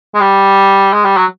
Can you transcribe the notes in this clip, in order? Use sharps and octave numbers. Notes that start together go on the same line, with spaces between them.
G#3
G3
G#3
G3
F#3